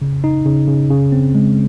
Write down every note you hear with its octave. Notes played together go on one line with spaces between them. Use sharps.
C#3
D#4
C#3
C#3
C#3
C4
G#3